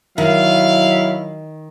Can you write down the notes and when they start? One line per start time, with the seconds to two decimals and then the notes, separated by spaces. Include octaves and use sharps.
0.18 D#3 F#3 E4 F5